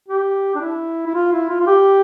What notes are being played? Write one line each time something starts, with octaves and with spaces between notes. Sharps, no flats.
G4
D4
E4
E4
F4
E4
F4
F4
G4